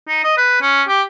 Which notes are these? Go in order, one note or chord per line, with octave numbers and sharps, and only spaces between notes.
D#4
D#5
B4
C#4
G4